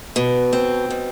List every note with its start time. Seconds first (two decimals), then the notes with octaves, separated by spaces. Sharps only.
0.16 B2
0.53 C4
0.90 B2